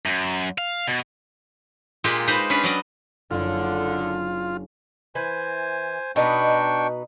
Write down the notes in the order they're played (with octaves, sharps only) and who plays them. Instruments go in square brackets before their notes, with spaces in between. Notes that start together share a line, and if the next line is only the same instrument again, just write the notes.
[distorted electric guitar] F#2
F5
B2
[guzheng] A#2 G#3 A#3 F4 G4
D#4 B4 C5 A#5
C#4 D4 B4 F5
F#3 D5 D#5
[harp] F#1 D4 [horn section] D3 [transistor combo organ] F4
[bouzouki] E3 [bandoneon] C5 G#5
[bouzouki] B2 D#4 B4 [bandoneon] D4 G5 C#6